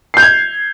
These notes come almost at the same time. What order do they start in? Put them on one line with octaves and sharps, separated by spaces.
C7 G6 F7 G#6